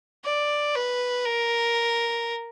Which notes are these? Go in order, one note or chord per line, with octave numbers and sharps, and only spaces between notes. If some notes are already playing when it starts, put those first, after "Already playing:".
D5
B4
A#4